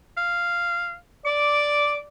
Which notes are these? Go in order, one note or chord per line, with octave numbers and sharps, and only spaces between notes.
F5
D5 D6